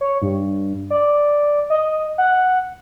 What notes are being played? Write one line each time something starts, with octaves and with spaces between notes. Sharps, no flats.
C#5
G2
D5
D#5
F#5